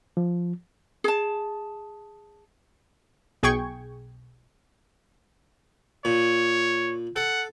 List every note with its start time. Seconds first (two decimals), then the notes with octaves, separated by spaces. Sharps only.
0.17 F3
1.04 G#4 A5
3.43 B1 G#4 G5 C#6 G#6
6.05 A#2 C#5
7.16 A4 F#5